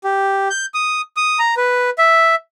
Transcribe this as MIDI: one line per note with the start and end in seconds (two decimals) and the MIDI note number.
0.04 0.49 67
0.50 0.66 91
0.74 1.01 87
1.17 1.39 87
1.39 1.55 82
1.57 1.90 71
1.98 2.35 76